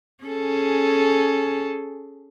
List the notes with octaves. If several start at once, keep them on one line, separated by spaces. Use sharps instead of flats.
C#4 G#4 A4